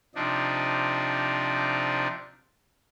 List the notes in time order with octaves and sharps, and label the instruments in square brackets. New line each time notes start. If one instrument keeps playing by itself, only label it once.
[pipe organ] C3 F3 D4 D#4